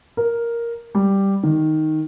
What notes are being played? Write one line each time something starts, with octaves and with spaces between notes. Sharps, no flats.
A#4
G3
D#3